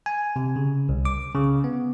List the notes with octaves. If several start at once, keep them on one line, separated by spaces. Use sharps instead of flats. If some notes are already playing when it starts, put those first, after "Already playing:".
G#5
C3
C#3
C2
D6
C#3
B3